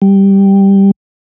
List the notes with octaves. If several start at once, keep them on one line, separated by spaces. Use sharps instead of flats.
G3